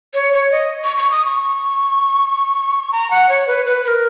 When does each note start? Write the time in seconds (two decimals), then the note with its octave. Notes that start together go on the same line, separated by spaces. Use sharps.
0.14 C#5
0.33 C#5
0.52 D#5
0.84 C#6
0.97 C#6
1.11 D#6
1.25 C#6
2.92 A#5
3.11 F#5
3.29 C#5
3.47 B4
3.66 B4
3.84 B4
3.88 A#4